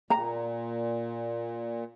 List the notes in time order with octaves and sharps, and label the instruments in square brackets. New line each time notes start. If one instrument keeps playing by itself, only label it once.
[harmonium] A#2 [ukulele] A#5